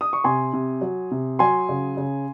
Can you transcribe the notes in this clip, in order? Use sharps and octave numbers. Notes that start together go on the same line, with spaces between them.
D#6
C#6
C3 G#5 C6
C3
F#3
C3
F#3 G#5 C6
C#3
C#3